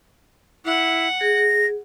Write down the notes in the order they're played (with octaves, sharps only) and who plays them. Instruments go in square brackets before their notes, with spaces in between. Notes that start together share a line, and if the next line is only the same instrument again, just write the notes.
[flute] E4 [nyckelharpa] F#5
[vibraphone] G#4 [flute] A#6